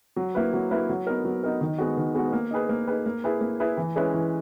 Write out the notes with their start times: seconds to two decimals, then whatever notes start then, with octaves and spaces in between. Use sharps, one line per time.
0.16 F#3
0.35 A#3 E4 B4
0.53 F#3
0.71 A#3 E4 B4
0.89 F#3
1.07 B3 D#4 A#4
1.24 F#3
1.44 B3 D#4 A#4
1.61 D#3
1.78 G#3 B3 F#4
1.97 D#3
2.15 G#3 B3 F#4
2.33 A#3
2.51 D#4 G#4 B4
2.69 A#3
2.87 D#4 G#4 B4
3.06 A#3
3.24 E4 G#4 B4
3.41 A#3
3.60 E4 G#4 B4
3.77 E3
3.96 G#3 C#4 E4 B4
4.14 E3